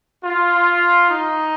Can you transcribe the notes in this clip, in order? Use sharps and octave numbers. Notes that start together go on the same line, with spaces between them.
F4
D#4